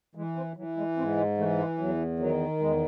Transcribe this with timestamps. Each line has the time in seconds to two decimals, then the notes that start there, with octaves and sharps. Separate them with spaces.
0.15 E3 G#3
0.36 C4
0.57 E3 F#3
0.77 G#3
0.97 G#2 C4
1.17 G#3
1.38 E3 A3
1.58 G#3
1.78 E2 F#3
2.19 D#3 F#3
2.60 E2 G#3